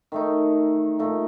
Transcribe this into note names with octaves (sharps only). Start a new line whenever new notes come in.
D#3 A3 D#4
A#2 A3 D#4